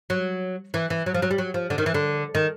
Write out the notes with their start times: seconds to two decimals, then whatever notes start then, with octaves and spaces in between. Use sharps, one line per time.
0.10 F#3
0.74 E3
0.90 E3
1.06 F#3
1.14 F3
1.22 F#3
1.31 G3
1.38 F#3
1.54 F3
1.70 D3
1.78 D#3
1.86 E3
1.94 D3
2.35 D#3